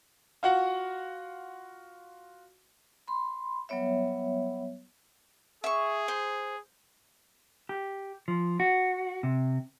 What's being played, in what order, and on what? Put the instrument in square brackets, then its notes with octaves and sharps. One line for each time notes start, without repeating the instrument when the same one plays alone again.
[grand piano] F4 F#4 F#5
[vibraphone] B5 C6
F#3 G3 B3 C#5 E5
[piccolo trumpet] G#4 [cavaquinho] E5 C#6
[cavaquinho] C5
[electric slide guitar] G4
F3
F#4
C3